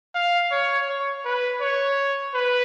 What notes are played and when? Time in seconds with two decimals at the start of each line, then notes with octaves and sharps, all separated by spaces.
0.15 F5
0.51 C#5
0.88 C#5
1.25 B4
1.61 C#5
2.34 B4